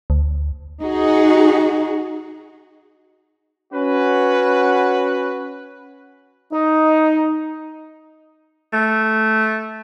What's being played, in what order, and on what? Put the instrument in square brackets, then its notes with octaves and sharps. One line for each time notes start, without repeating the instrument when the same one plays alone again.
[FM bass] D2
[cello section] D#4 F#4 G#4
[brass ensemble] C#4 F#4 B4
[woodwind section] D#4
[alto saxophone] A3